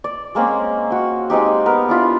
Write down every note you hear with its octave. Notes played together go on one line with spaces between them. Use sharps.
D5
G#3 A#3 C4 C#4
F#4 G5
G#3 C4 D#4 G4
B3 A#4
D4 E4 F4 B5